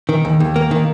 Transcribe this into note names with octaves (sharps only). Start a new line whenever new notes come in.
D#3
D#2
D#2
A#3
D#3